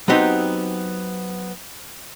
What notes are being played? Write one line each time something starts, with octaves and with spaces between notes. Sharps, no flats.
F#3 B3 C4 D#4 G4